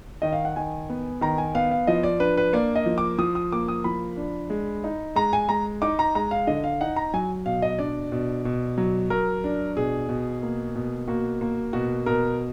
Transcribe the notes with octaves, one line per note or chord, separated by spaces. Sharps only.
D#3 D#5
F5
F#5
D#3 G#5
B3
D#3 A#5
G#5
B3 F5
F5
F3 D#5
D5
D4 B4
B4
A#3 D5
D#5
F3
D6
F3 D#6
D#6
A#3 D6
D#6
F3 B5
D4
G#3
D#4
G#3 A#5
G#5
G#3 A#5
D#4 D6
A#5
G#3 A#5
F5
D3 D#5
F5
D#4 F#5
A#5
F#3 G#5
B2 F5
D#5
D4 D5
B2
B2
F#3
F#3 A#4
D4
B2 G#4
B2
A#3
B2
A#3 F#4
A#3
B2 F#4
B2 A#4